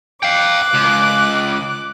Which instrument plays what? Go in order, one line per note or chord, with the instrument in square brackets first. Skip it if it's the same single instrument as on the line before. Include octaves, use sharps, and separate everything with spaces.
[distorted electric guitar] F5 G5 [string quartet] D6 F#6
[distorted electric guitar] C#2